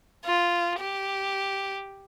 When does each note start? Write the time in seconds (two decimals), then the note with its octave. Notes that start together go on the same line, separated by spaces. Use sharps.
0.25 F4
0.79 G4